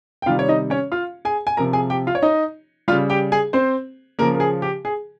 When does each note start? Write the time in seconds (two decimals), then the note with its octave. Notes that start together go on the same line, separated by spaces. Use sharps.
0.22 G5
0.26 C3 D#3 G3 F4 F5
0.39 C#5
0.49 D#4 D#5
0.70 C#4 C#5
0.92 F4 F5
1.25 G#4 G#5
1.47 G#5
1.57 C3 F3 A#4 A#5
1.73 G#4 G#5
1.90 G4 G5
2.07 F4 F5
2.15 C#5
2.22 D#4 D#5
2.88 G3 F4 F5
2.92 C#3
3.10 G4 G5
3.32 G#4 G#5
3.53 C4 C5
4.19 C#3 A#3 A#4
4.22 F3
4.35 A#4
4.40 G#4
4.62 G4
4.85 G#4